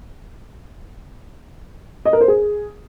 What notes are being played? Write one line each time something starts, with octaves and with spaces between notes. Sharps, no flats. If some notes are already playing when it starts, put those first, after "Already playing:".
D#5
A#4
C5
G#4